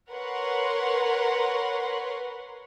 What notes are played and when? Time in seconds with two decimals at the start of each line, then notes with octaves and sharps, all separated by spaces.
0.11 A#4 B4 C#5 F#5 C6